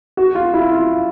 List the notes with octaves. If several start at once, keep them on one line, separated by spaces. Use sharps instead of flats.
F#4
F4
E4
F4